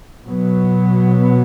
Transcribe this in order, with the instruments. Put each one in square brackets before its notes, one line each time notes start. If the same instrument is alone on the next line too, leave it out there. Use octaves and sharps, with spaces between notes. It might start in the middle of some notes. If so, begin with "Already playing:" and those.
[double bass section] B2 F#3 B3